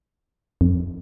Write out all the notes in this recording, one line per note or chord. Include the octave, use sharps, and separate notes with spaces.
F2